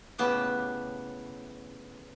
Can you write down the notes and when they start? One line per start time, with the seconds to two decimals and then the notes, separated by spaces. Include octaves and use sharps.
0.18 A2 C#3 B3 G4 A5